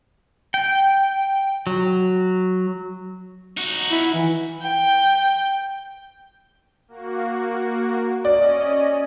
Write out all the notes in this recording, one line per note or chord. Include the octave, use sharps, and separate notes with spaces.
G5
F#3
D#4 F#4
E4
E3
G5
A#3 F#4
C#4 D5 D#5